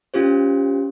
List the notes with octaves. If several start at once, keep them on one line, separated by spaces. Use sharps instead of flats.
C#4 F4 G4 C5